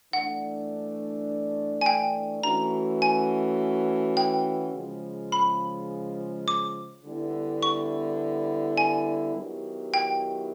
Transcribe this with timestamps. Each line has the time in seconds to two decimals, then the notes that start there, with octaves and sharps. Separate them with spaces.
0.13 E3 A3 D4 F#5
1.81 G#5
1.86 G5
2.43 E3 A3 C#4 F#4 A#5
3.02 G#5
4.17 G5
4.74 C#3 F3 G#3
5.32 B5
6.48 D6
7.05 D3 G3 B3 E4
7.63 C#6
8.77 G#5
9.36 D#3 F#3 B3 E4 G4
9.94 G5